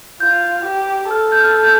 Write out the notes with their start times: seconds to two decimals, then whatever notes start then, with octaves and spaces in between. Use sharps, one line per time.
0.20 F4 G6
0.65 G4
1.10 A4 F6
1.32 G6
1.40 F6
1.63 G6